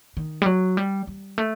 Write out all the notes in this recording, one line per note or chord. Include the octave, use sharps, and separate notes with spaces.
D#3
G3
F#3
G3
G3
A3